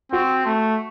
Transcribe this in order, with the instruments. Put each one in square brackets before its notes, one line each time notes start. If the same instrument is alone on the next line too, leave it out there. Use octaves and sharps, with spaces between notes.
[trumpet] C4 [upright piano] F#4
[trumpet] A3